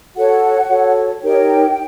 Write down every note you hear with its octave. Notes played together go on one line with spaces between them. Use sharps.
F#4 A4 C#5 F#5
F#4 A4 C#5
D#4 G4 A#4 C#5 G5